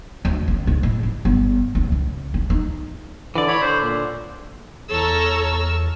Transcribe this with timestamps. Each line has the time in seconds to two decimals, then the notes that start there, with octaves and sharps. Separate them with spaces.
0.25 D2
0.48 C#2
0.67 G#2
0.83 A2
1.03 C#3
1.25 G1
1.75 C#2
1.92 C#2
2.34 D4
2.50 D#4
3.35 D3 E3 D5
3.48 C#5 B5
3.61 D3 C5
3.81 A#2
4.90 E2 A4 C#5 A5 A#5 C#6 E6 F6